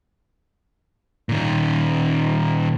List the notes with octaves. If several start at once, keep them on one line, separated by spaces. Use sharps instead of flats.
A#2 D#3